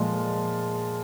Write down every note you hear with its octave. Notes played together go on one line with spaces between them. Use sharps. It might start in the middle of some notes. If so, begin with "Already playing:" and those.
Already playing: A#2 F3 G#3